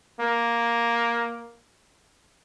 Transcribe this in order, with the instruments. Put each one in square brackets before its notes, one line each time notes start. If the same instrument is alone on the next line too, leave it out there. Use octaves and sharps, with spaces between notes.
[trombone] A#3